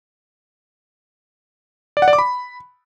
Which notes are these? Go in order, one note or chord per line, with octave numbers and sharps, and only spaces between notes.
D5
F#5
D5
D6
B5